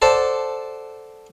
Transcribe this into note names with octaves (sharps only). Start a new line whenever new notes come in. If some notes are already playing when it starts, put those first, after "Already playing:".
A4 C5 D5 F#5 A5